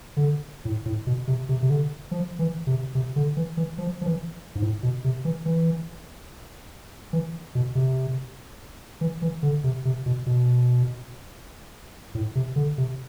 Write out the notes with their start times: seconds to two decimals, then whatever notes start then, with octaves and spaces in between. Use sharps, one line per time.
0.17 D3
0.65 A2
0.86 A2
1.07 B2
1.28 C3
1.49 C3
1.62 C3
1.70 D3
2.11 F3
2.39 E3
2.67 C3
2.95 C3
3.16 D3
3.37 E3
3.57 E3
3.78 F3
4.01 F3
4.06 E3
4.55 G#2
4.62 A2
4.83 B2
5.04 C3
5.25 E3
5.46 E3
7.13 E3
7.55 B2
7.75 C3
9.01 E3
9.22 E3
9.43 D3
9.64 C3
9.85 C3
10.06 B2
10.26 B2
12.15 A2
12.35 C3
12.56 D3
12.78 C3